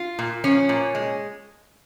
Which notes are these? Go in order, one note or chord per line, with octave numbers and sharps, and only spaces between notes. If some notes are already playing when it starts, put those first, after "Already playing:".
Already playing: F4
A#2
F3 C#4
A#2
G#3